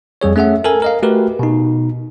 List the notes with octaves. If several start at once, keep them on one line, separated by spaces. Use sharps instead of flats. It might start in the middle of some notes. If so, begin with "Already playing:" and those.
F2 G3 G#4 C#5
A3 C#4 G#4 E5 F#5
A4 A#4 G#5
A#4 D#5 F5
A3 F#4 G4 A#4 B4
B2 D#4